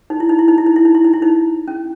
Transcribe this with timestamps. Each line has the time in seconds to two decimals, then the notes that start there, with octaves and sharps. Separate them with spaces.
0.10 D#4
0.20 E4
0.29 D#4
0.39 E4
0.48 D#4
0.58 E4
0.66 D#4
0.76 E4
0.85 D#4
0.95 E4
1.04 D#4
1.13 E4
1.22 D#4
1.68 C#4